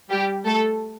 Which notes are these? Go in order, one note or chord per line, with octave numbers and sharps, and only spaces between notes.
G3 G4
A3 A4